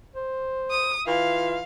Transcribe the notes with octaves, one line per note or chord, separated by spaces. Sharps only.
C5
D#6
E3 F4 F5